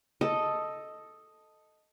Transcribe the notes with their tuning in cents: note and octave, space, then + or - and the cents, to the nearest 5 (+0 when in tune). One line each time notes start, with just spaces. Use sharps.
A4 +0 D#5 +0